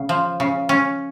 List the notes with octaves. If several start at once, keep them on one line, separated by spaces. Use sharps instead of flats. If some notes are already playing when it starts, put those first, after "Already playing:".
Already playing: C#3
F3
C#3
C#4